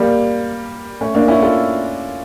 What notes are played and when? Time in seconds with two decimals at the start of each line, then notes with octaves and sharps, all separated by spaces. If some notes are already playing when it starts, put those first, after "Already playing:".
Already playing: G3 A#3
1.01 A3 C#4
1.15 A#3 D4
1.28 C#4 E4
1.41 F4 A4